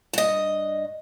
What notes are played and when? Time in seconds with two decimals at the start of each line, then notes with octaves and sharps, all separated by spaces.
0.13 G2 D#5